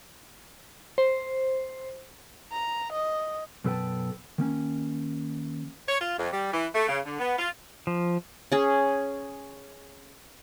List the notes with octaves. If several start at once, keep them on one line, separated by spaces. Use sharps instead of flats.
C5
A#5
D#5
F#2 B2 A4 B4 G5 A5
D#3 A#3 C#4
C#5
F4
F2
G3
E3
A3
C#3
D3
B3
F4
F3
C#4 G#4